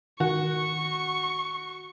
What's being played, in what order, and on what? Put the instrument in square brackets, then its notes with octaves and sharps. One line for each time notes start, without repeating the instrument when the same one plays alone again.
[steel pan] D#3 [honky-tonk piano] F#4 [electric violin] C#6